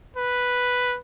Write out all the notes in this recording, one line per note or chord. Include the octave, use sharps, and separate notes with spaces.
B4